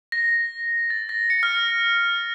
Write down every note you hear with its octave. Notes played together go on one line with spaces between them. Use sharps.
A#6
A6
A#6
C#7
F6